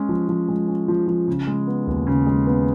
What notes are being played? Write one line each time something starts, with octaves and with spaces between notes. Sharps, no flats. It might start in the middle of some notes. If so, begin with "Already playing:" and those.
Already playing: G#3 C#4
F3
F3
G#3
C#4
F3
F3
C#3
G#3
B3
D#2
C#3
G#3
B3